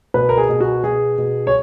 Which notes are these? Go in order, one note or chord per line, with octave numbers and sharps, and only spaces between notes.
B2 B4
A#4
G#4
B2
F#4
B2 G#4
B2
C#5